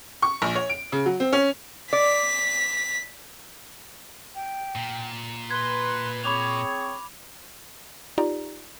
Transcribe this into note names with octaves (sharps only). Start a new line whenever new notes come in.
C#6
A#1
C#5
D7
C#3
F#3
C4
C#4
D5 B6
G5
A#2
B4 C6 G#6 G7
C4 G#4 C#5 B5 C#6 D6 F7
D#4 F4 G4 D5 A#5